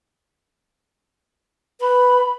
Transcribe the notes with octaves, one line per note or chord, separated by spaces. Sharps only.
B4 B5